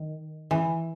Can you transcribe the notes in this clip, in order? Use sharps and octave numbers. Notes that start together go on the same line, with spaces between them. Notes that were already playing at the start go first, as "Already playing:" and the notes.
Already playing: D#3
E3